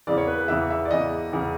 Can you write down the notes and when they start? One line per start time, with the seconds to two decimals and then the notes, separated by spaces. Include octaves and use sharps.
0.07 E2 C#3 E3 D5
0.18 C#5
0.27 B4
0.39 B4
0.48 E2 C#3 E3 E5
0.70 E5
0.85 D5
0.91 E2 C#3 E3 D#5
1.33 E2 C#3 E3